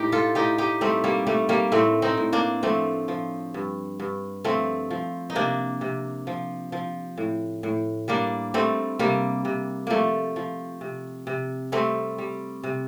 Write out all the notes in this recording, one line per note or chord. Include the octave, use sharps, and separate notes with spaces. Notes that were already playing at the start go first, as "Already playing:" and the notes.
Already playing: A2 D#4 G4
F4 A4
A2 D#4 G4
D#4 G4
G3 A3 C4
G3 A#3
G3 A3
G3 A#3
A2 A3 C4
C4 D#4
A2
A#3 D4
F3 A3 C4
F3
G2
G2
F3 A3 C4
F3
D#4
C3 A#3 D4
C3
F3
F3
A2
A2
G3 A#3 D4
G3 A3 C4
C3 G3 A#3
C3
F3 A3 A#3
F3
C3
C3
G3 A3 C4
G3
C3